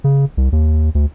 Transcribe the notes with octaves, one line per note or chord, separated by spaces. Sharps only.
C#3
C2
D#2
D2